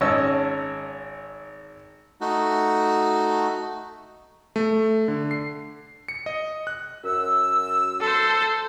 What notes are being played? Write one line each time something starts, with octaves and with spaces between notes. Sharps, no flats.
G#1 C#4 C#5 D#5 A5 E6
A3 D#4 F#4
A3
D3
C7
C#7
D#5
F#6
F#2 E6
A4 C5